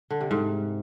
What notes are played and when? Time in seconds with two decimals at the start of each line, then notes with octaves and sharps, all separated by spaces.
0.11 D3
0.21 C3
0.31 G#2